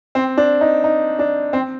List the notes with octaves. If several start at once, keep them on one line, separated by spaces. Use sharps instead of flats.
C4
D4
D#4
D#4
D4
C4